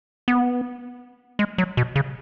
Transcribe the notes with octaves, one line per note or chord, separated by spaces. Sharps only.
B3
G#3
F#3
B2
C#3